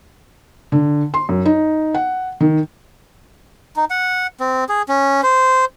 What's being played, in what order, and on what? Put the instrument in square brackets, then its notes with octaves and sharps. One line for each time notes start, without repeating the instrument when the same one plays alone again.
[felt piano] D3
C6
F#2
D#4
F#5
D#3
[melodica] D#4
F#5
C4
G#4
C#4
C5